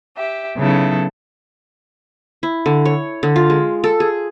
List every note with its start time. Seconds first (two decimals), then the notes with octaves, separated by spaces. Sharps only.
0.16 G4 E5
0.57 C#3 F#3 B3 D#4 E4 A4
2.43 E4
2.66 D3
2.85 C#5
3.23 D3
3.36 F4
3.50 G#3
3.84 A4
4.00 G#4